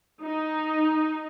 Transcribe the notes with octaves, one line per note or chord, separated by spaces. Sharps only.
D#4